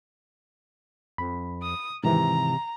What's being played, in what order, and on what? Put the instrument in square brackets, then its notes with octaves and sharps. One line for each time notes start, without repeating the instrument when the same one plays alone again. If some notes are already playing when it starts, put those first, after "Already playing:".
[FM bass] F2 [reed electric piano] B5
[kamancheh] D#6
[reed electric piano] G#2 D#3 E3 [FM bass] C3 [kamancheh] A#5